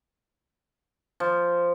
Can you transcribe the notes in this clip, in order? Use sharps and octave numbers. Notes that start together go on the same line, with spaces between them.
F3